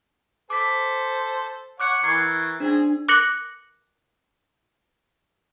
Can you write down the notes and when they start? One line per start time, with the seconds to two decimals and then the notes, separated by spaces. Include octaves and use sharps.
0.50 A4 C5 D6 B6
1.80 C#5 F#5 D6 F#6 C#7
2.04 E3 A#4 C#6 G#6 C7
2.60 C4 D4 G#4
3.08 D6 F#6 A#6 C#7 F#7